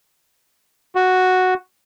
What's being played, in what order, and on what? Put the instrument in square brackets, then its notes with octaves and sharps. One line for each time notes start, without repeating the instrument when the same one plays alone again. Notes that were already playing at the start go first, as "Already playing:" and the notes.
[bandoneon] F#4